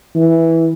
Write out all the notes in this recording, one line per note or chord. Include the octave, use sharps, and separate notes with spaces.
E3